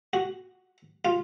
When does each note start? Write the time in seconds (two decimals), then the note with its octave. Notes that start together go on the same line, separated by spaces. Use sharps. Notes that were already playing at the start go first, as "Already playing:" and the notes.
0.13 F#4
1.05 F4